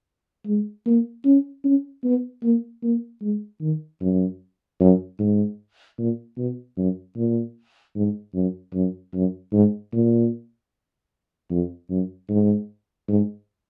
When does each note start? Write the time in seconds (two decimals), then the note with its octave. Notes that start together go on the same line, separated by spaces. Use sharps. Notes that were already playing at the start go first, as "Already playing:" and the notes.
0.46 G#3
0.86 A#3
1.25 C#4
1.64 C#4
2.04 B3
2.43 A#3
2.83 A#3
3.22 G#3
3.61 D#3
4.01 F#2
4.80 F#2
5.19 G#2
5.98 A#2
6.38 B2
6.77 F#2
7.17 A#2
7.96 G#2
8.34 F#2
8.74 F#2
9.14 F#2
9.53 G#2
9.93 A#2
11.50 F2
11.90 F#2
12.29 G#2
13.08 G#2